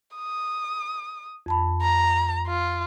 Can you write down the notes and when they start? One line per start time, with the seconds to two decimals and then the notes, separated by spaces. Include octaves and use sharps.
0.16 D#6
1.46 F2 A5 B5
1.82 A#5
2.47 F4